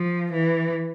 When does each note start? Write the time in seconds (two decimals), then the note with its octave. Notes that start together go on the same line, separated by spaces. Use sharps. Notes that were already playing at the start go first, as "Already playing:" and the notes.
Already playing: F3
0.32 E3